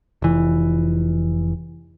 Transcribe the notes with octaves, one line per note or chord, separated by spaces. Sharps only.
F1 E3